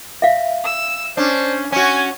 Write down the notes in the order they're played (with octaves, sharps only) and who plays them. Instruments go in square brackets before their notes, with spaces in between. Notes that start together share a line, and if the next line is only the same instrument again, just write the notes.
[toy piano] E5 F5
[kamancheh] E6
[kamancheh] C#4 [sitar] D4 [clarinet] C5
[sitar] C#4 F#4 [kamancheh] C#5 [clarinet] G#5